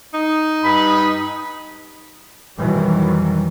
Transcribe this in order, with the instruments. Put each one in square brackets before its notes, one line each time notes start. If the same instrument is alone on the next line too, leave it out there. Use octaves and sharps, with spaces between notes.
[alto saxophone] D#4
[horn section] G2 B5
[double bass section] F2 B2 D#3 E3 F#3 G3